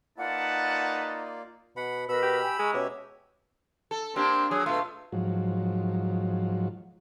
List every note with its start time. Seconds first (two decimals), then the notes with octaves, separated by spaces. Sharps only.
0.18 A#3 D#4 F4 B4 D5 F#5 A5
1.77 B2 F#5 B5
2.09 B2 A#4 B4 D#5 B5 E6
2.23 G4
2.42 G5 G#5
2.59 G#3 G#4 A#5 C#6 D6
2.74 B2 C#4 G4 C#5 E5
3.91 A4
4.16 A#3 C4 D4 G4
4.51 F#3 G#4
4.66 B2 A3 F4
5.12 G#2 F3 F#3